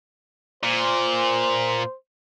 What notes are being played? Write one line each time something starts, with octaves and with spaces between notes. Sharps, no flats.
A#2 C5